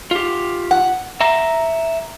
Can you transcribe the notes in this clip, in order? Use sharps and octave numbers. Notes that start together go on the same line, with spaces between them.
F4 G4
F#5
E5 A#5